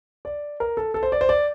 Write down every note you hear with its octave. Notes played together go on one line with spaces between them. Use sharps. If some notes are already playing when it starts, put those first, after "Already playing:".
D5
A#4
A4
A4
C5
D5
C5
D5